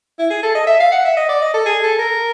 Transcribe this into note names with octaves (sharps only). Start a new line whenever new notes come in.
E4
G#4
A4
D#5
E5
F5
F#5
E5
D#5
D5
D#5
A4
G#4
A4
A#4